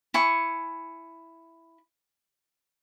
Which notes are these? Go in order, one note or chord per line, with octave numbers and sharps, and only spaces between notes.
E4 G#5 C#6